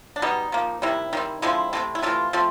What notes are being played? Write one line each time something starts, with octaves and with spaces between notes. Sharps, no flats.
D4
B2 G3 B3 D#4
F3 A#3
C3 D#3 G3 E4
D#3 G3 C4
D3 F3 G#3 C4 E4
C3 E3 A3 C4
E4
C3 E3 A3 F4
F3 A3 C4